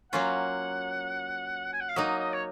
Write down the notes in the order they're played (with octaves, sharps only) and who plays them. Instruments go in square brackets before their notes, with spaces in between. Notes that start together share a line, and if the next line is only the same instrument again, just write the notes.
[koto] F#3 A#3 C#4 F4 [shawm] F#5
[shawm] G#5
F#5
F5
[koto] F#3 A#3 D#4 [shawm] D#5
[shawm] D#5
C#5